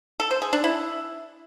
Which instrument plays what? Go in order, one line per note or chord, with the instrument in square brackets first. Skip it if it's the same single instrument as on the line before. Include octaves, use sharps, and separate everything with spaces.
[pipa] A4
C5
G#4
D4
E4